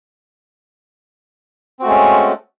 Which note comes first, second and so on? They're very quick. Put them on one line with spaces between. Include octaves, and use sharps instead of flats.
C4 F#4 A3 G#3 C#4